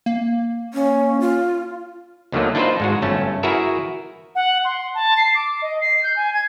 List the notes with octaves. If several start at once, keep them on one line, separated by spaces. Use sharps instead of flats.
A#3
C#4
F4
D#2 D3 D#3 F#3 A3 A#3
D4 D#4 F4 B4 C5
G#2 G#3 F#4
G1 A3 C#4 A5
E4 F#4 G#4 A#4 B4 E5
F#5
C6
A5
C7
D6
D#5
C7
G6
G#5
G#6